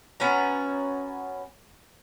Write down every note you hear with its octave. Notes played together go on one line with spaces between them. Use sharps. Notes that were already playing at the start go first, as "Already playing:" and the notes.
B3 C#4 F#4 A#5